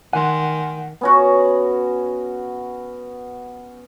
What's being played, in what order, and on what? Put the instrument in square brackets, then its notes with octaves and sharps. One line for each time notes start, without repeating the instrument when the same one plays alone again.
[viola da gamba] D#3 [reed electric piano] F#5 [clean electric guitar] G#5 C6
[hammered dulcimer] B3 C#4 F#4